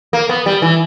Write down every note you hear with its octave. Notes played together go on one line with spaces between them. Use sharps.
A#3
B3
G3
E3